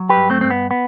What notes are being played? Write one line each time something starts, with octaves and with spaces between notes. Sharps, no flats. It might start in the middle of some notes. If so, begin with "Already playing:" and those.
Already playing: F#3
G4 B4
G2
A3 C4
G2 C4
B3
B3